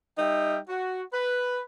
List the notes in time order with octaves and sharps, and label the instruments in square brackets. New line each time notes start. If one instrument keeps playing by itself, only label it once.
[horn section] G3 D#4 E5 G5
F#4
B4